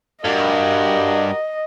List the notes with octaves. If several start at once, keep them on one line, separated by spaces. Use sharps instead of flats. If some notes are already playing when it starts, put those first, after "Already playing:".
G2 F#4 G4 A#4 D#5